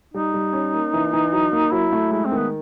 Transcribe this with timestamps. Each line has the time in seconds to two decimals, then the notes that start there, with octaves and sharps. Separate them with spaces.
0.14 G3 D#4
0.34 G3
0.53 C#4
0.74 A#3
0.94 E3
1.13 E3
1.33 F#3
1.52 A#3
1.72 F#3 E4
1.93 A3
2.12 G#3 E4
2.25 C4
2.32 D#3
2.38 B3